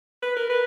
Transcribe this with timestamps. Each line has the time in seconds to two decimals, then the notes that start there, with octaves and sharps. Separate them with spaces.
0.23 B4
0.37 A#4
0.50 B4